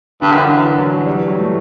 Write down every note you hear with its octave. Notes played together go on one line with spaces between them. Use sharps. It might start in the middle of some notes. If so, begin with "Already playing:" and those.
G2 D3
F#2
E3
F#2
E3
F#3
G3
E3
F#3
A3